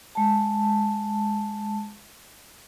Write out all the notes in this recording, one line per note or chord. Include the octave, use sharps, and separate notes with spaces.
G#3 A5